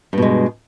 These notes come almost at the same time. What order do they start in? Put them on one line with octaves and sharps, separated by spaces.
G2 B2 G#3